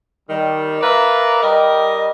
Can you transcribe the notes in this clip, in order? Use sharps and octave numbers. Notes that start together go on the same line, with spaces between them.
D#3 G3
A#4 B4 D5 E5 F5 A#5
G3 G4 A#4 D#5